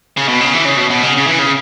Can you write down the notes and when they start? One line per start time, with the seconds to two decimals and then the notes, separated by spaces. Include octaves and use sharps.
0.17 C#3
0.28 B2
0.41 C#3
0.53 E3
0.65 C#3
0.77 B2
0.90 B2
1.03 C#3
1.16 C#3
1.27 E3
1.39 C#3